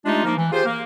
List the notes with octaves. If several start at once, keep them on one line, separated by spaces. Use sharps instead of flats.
G#3 A3 D4 D#4 F4 G4
F3 A#3 D#4
E3
F4 G4 G#4 C5
A#3